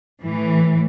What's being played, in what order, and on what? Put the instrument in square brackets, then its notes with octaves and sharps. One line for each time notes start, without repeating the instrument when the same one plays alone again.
[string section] A2 E3